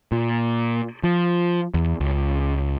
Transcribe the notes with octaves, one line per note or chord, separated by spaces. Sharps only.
A#2
F3
E2
C#2